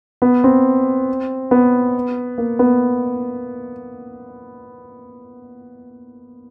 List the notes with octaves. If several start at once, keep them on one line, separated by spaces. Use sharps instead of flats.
B3
C4
B3
A#3
B3